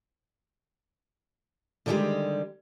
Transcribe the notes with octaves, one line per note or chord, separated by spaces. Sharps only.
D3 D#3 F3 G3 G#3 G4